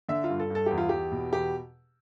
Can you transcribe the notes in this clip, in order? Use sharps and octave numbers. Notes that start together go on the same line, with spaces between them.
D3 E5
F4
G2
A4
G2
A4
E2 G4
F4
E2 G4
B2
E2 G4